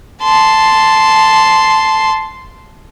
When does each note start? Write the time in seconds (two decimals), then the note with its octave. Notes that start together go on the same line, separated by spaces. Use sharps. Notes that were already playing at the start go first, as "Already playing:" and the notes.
0.23 A5 C6